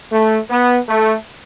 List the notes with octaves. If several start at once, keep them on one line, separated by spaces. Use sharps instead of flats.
A3
B3
A3